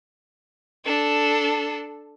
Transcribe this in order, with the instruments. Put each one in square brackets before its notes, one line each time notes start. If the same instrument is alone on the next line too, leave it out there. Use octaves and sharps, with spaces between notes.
[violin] D4 A4